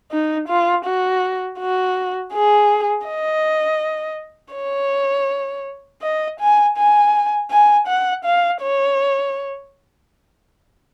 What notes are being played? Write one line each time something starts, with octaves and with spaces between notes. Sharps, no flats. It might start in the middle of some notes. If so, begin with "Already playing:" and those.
D#4
F4
F#4
F#4
G#4
D#5
C#5
D#5
G#5
G#5
G#5
F#5
F5
C#5